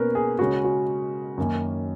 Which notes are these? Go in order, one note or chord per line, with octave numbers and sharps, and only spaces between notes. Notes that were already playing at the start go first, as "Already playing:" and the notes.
Already playing: B2 A#3 C#4 A#4 B4
G#4
C#3 G#3 C#4 F#4
F#4
F#2 D#3 A#3 C#4